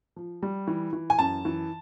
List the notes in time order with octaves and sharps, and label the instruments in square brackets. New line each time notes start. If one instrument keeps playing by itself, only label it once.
[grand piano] F3
G3
E3
E3
G#5
F#2 A5
E3